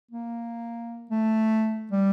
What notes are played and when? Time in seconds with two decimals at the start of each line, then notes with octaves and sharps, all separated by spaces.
0.11 A#3
1.11 A3
1.91 G3